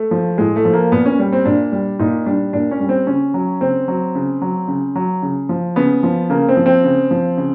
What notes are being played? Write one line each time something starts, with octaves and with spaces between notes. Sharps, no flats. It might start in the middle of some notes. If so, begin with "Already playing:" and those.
Already playing: A3
F3
A2 G#3
A3
F3
A#3
A#2 B3
C#4
G3
C4
A#2 D4
G3
A#2 D#4
G3 D4
A#2 D4
C#4
G3
C4
C#3 C#4
F#3
C#3 C4
F#3
C#3
F#3
C#3
F#3
C#3
F3
C#3 B3
F3
C#3 A#3
C4
F3
C4
C#3
F3
C#3